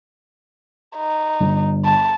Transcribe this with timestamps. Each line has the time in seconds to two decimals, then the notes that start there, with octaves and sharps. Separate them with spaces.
0.97 D#4
1.40 G1
1.85 A5